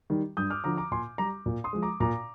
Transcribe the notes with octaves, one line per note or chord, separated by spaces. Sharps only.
D#3 G3
G2 D#6 G6
D6 F6
D3 F3 A#5 D6
A#5 D6
A#2 G#5 C6
G3 A#5 D6
A#2
C6 D#6
F3 G#3
A#5 D6
A#2 A#5 D6